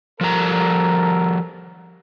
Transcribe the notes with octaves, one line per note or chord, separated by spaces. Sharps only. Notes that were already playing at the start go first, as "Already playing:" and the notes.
F3 G3 A4 A#4 A#5